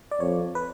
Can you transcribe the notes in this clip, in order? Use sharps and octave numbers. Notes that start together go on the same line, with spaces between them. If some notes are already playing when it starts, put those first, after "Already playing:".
D5
F2 C#5
B4